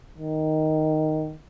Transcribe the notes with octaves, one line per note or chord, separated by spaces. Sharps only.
D#3